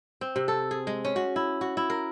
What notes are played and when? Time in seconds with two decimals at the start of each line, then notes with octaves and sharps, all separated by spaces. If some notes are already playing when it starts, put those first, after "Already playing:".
0.21 C4
0.36 C3
0.48 A4
0.71 G#4
0.87 G#3
1.05 C#4
1.16 F#4
1.36 E4
1.61 F#4
1.77 E4
1.90 A#4